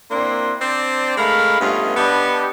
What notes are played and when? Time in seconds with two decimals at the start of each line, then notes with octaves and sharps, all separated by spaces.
0.11 A#3 C4 D4 E4 C6
0.61 C4 D4 C5 D5
1.17 G#3 A3 A#4 F5 B5
1.61 G2 A3 B3 C#4 F4 D#5
1.96 B3 D4 G4 D#5 A5 B5